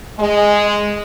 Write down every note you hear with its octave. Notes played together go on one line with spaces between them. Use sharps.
G#3